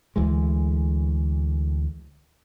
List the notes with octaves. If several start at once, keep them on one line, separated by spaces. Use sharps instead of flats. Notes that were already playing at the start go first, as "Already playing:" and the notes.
D2 E3 G#3